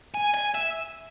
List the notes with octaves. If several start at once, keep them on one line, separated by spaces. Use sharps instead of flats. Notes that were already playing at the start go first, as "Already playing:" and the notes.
G#5
G#5
E5